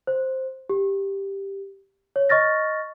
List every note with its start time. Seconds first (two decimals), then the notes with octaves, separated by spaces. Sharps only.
0.07 C5
0.69 G4
2.16 C#5
2.29 D#5 C#6 F6 A6 A#6